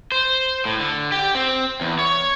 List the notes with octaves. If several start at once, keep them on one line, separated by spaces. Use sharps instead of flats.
C5
A2
D3
G4
C4
E2
C#5